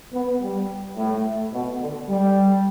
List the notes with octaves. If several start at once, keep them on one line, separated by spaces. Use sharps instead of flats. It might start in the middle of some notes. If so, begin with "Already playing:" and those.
B3
G3
A2
B2
D3
G3